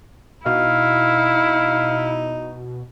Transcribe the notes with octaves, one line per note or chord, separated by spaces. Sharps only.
B2 D#4 E4 F5